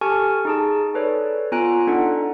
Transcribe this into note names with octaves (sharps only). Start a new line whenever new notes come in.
G4 A4 G#5 A5 C#6 F6
D#4 G#4 A5
A4 B4 C#5 D5
B3 F4 G#5 A#5 F#6 D7
D4 D#4 A4 F#5